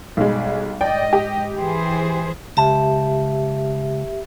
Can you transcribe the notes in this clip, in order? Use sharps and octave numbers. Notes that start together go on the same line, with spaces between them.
B1 G3 G#3
G#2 D5 D#5 G5
G4
E3 G#4 C5
C#2 G4 E5 A5